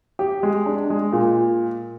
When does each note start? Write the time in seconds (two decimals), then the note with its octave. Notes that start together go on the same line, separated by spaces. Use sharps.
0.19 G4
0.43 G#3
0.66 D4
0.90 G#3
1.13 A#2